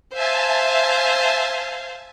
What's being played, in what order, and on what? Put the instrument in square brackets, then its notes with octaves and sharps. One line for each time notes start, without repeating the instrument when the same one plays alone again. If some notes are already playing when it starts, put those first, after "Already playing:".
[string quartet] C5 F5 [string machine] E5 G#5 A5